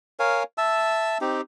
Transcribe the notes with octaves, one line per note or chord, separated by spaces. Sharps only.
A#4 C#5 F5 G#5
E5 A5 E6
C4 D#4 G4